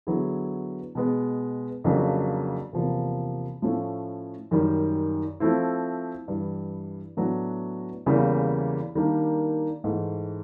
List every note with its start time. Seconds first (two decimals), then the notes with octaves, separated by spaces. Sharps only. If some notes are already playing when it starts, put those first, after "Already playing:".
0.07 D3 F#3 B3 E4 G#4
0.95 B2 G#3 B3
1.84 F2 C#3 F#3 A#3 D4
2.73 E2 C3 F3 A#3
3.62 A2 F3 A3 C#4
4.51 F#2 D#3 G3
5.40 F3 A3 C4 E4
6.28 G2 E3 G3
7.17 A2 F#3 B3 D4 F#4
8.06 E2 C#3 E3 G3 A#3
8.95 D#3 G3 A#3 D4
9.84 G#2 E3 A3